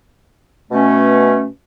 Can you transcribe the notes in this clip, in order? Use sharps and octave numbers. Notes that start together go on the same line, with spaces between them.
B2 A3 C#4